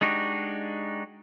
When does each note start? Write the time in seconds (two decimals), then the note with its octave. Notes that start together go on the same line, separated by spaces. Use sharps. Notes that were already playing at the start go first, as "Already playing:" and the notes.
0.01 G#3 D4 D#4 F#4 G4